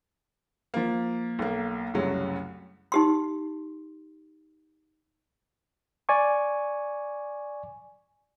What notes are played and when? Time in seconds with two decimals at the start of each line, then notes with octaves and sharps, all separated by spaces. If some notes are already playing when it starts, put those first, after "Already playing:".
0.74 F3 A#3
1.39 B1 A#3
1.94 C2 F#2 C#3 F#3 A3
2.92 D#4 G4 C6
6.09 D5 G#5 C#6